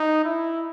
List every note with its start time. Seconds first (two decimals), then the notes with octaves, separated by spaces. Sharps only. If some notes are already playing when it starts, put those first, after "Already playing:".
Already playing: D#4
0.24 E4